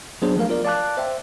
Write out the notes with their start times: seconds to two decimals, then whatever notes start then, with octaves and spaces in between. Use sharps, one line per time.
0.22 F#3 B3 D4 G#4 C5
0.36 F3 A3 A#4 F5
0.49 F4 A#4 D5
0.65 D5 F5 A5 D6 F#6
0.97 C5 E5 G5